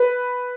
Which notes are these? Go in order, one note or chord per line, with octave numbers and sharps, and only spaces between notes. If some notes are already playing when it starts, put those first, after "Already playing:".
Already playing: B4